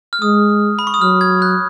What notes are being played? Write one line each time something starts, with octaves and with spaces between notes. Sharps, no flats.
F6
G#3 D#6
B5
C#6
D#6
F#3 F6
G#6
F#6